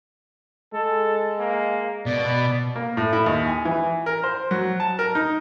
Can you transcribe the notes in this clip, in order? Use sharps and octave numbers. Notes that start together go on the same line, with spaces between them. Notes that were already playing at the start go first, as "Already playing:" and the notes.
G#3 A4
A#3
B2 D5
A#3
A2
E4
D#2
G#5
E3
A#4
C5
F#3
A5
A#4
D#4